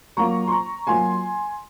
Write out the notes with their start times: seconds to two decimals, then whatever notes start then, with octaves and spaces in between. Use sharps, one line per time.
0.17 F#3 A#3 F4 A#5 C#6
0.47 C6
0.52 A#5 C#6
0.87 F#3 A#3 F4 G#5 C6